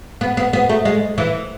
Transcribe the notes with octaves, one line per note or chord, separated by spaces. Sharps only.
B3
B3
B3
A3
G#3
E3